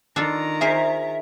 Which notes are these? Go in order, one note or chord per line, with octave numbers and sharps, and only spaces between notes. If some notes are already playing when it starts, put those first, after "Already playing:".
D#3 D4 F4 A4 A#5
G#4 A#4 C5 E5